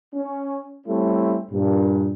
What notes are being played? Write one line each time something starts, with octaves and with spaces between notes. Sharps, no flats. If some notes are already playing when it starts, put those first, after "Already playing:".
C#4
G3 A3 C4 C#4 E4
G2 A#2